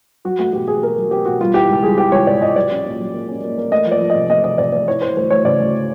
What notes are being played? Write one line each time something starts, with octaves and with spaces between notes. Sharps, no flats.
F#3 F#4
A3 F#4
B2 G4
B2 G#4
A3 A#4
F#3
C4 G4
B2 F#4
G3 F4
E3 G4
C#2
G3 G#4
E3 G4
C#2 C#5
C3 D5
C#2 D#5
F#3 D5
C#4
A#2
F#3
A#3
C#4
A#3
A#3
A3 D#5
F3
D5
F3
D#5
C3
A3 D#5
C3 D#5
C3 D5
A3 D5
E3 C#5
E3 C5
D2 C5
D2 C#5
C#3 D5
D2